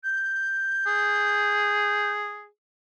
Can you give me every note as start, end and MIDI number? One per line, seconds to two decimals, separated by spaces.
0.04 2.11 91
0.87 2.47 68